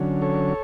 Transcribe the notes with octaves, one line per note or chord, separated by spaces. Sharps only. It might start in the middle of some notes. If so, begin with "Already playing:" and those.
Already playing: D3 F#3 C#4
A4 C#5